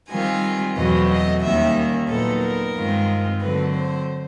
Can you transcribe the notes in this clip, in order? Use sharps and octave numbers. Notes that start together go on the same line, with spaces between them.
D#3 G3 C4 F4 G#5
E2 B2 F#3 A3 C4 D#5
D#5
D#2 D#3 G3 A#3 C#4 E5
A#2 F#3 B3 D#4 A4
A#4
G2 D#3 G#3 C4 F4
D3 F#3 A3 C4 B4
C5